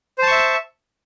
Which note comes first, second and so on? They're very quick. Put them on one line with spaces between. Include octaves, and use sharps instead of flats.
C5 A5 C#6 E5